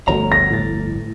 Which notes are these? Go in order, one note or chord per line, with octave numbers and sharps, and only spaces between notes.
G1 D2 F3 A3 F#4 C#5 A#5
A#6
A2 A6